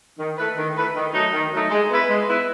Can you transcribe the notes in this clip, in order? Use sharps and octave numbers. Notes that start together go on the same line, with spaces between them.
D#3
A3 E4 B4
D#3
A3 E4 B4
D#3
F#3 A3 D#4
D#3
F#3 A3 D#4
G#3
B3 E4 B4
G#3
B3 E4 B4